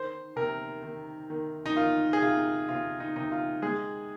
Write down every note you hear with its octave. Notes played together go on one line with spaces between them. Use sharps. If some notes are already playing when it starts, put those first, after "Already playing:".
Already playing: D#3 C5
C3 A#4
D#3
D#3
D#4
D#3 F4
G#4
C3 F4
C3 F4
D#4
C3 D#4
F4
G#3 G#4